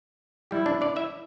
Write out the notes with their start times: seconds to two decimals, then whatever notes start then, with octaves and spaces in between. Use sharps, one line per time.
0.51 G3 E4 G4
0.66 D4 D5
0.81 D4 D5
0.96 E4 E5